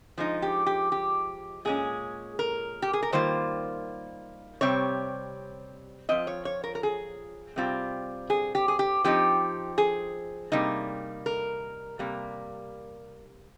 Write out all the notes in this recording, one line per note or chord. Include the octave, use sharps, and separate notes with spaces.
F3 G#3 D#4
G4
G4
G4
A#2 G#3 C#4 G#4
A#4
G4
G#4
A#4
D#3 G3 A#3 F4 C5
C3 G3 C4 C#5
F3 C4 F4 D#5
C#5
C#5
A#4
A#4
G#4
C3 G3 C4 F4
G#4
G4
G#4
G4
F3 C4 D#4 G4
G#4
C3 G3 A#3 D#4
A#4
C3 G3 A#3